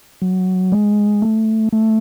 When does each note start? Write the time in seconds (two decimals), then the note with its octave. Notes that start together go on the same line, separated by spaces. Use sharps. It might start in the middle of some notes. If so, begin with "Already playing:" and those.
0.22 F#3
0.72 G#3
1.22 A3
1.73 A3